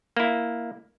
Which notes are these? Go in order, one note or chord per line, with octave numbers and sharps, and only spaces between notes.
A#3 E4